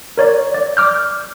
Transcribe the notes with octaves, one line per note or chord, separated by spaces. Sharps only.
A#4 C#5 D5
D5
D6 F6 G6